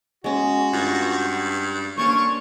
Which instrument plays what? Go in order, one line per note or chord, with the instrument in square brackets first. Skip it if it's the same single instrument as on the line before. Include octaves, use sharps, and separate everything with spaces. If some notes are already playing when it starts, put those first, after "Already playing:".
[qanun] G#3 C#4 [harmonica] F#4
[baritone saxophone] G2 [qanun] F4
[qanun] A#3 D4 C5 [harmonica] C#4 C#5 C#6